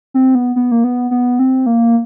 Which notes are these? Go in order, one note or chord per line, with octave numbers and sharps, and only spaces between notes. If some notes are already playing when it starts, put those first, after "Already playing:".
C4
B3
B3
A#3
B3
B3
C4
A#3